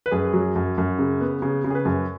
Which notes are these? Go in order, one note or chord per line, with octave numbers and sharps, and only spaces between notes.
B4
F#2 G#4
F#3
F#2
F#2
C#3
B3
C#3
C#3
G#4
B4
F#2